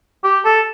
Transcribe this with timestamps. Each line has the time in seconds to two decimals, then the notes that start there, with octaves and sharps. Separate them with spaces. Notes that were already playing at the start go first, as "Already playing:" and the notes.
0.24 G4
0.45 A4